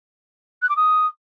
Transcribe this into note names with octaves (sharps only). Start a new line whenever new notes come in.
F#6
D6
D#6